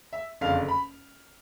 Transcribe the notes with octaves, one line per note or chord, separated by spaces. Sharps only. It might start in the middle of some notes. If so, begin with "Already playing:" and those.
E5
F#1 F2 D3 F5
B5